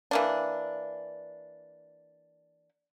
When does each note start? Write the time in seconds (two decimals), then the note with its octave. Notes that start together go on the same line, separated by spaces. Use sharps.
0.11 E3 A#3 D4